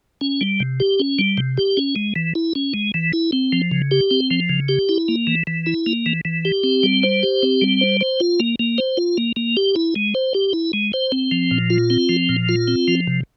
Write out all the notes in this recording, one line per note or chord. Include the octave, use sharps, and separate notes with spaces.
C#4
G3
C3
G4
C#4
G3
C3
G4
C#4
G#3
E3
E4
C#4
G#3
E3
E4
C4
F3
C#3
G4
C4
F3
C#3
G4
E4
A#3
E3
E3
E4
A#3
E3
E3
G4
C4
G3
C5
G4
C4
G3
C5
C5
F4
A#3
A#3
C5
F4
A#3
A#3
G4
E4
G#3
C5
G4
E4
G#3
C5
C4
F3
A#2
F4
C4
F3
A#2
F4
C4
F3
C3